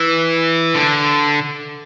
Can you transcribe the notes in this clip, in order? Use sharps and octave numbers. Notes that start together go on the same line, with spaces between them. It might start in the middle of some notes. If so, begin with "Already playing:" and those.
Already playing: E3
D3